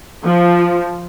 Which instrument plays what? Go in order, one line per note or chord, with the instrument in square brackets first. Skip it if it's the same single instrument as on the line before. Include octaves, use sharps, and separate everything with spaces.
[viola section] F3